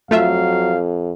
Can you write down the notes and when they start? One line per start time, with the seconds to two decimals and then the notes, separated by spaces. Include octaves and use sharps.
0.11 F2 F#3 A3 F4 E5 F5